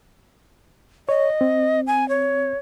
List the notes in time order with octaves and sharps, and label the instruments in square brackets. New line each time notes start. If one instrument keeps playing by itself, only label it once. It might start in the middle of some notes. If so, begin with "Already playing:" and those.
[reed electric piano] C#5 [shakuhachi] D#5
[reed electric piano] C4
[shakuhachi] G#5
C#5